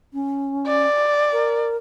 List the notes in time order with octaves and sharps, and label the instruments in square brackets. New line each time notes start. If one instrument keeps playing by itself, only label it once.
[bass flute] C#4
[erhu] D5
[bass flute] A#4